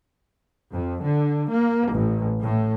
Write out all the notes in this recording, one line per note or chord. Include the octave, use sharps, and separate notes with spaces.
F2
D3
A#3
A1
A2